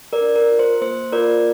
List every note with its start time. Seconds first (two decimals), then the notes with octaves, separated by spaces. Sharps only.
0.13 A#4 D5
0.21 D4
0.36 A#4
0.51 F4
0.59 C5
0.81 A#3 C5
1.12 F4 A#4 D5